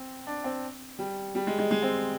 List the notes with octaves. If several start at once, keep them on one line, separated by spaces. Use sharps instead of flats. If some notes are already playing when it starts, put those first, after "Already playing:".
Already playing: C4
D4
C4
G3
G3
G#3
G#3
G#3
C4